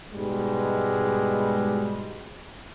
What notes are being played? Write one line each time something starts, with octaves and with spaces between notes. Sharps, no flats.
G#2 B2 G3 G#3